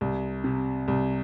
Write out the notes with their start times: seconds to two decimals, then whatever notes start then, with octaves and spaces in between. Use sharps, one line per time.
0.01 C2
0.44 C3
0.88 C2